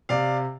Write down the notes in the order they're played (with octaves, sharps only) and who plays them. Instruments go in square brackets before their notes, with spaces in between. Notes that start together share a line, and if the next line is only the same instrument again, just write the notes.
[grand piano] C3 D5 F5